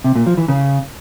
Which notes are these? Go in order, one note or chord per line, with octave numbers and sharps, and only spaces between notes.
C3
A#2
F3
E3
C#3